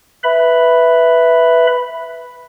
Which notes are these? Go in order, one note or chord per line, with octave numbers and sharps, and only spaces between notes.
B4 E5 B5